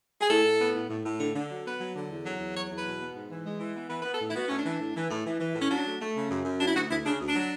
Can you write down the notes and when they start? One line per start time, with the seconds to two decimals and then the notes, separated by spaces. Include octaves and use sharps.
0.21 G#4
0.30 A2 A4
0.45 A2
0.60 B3
0.75 A2
0.90 A2
1.05 A2
1.20 D3
1.35 D3
1.50 F#3
1.65 B3 B4
1.80 F#3
1.95 D3
2.10 E2
2.25 F#3
2.39 E2
2.55 F#3 C#5
2.70 E2
2.77 B4
2.85 B2
3.00 B3
3.15 G#2
3.30 E3
3.45 G#3
3.60 E3
3.75 B3
3.90 E3 B4
4.02 B3 B4
4.13 A4
4.20 A2
4.29 E4
4.35 B3 F#4
4.47 A2 C#4
4.57 D4
4.65 E3
4.80 A2
4.95 E3
5.10 A2
5.25 E3
5.40 E3
5.55 A2 C#4
5.70 F#3 D4
5.85 A3
6.00 A3
6.15 C#3
6.30 F#2
6.45 F#2
6.60 F#3 D4
6.68 E4
6.75 D2 F#4
6.90 D2 E4
7.05 C#3 D4
7.20 D2
7.28 D4
7.35 F#3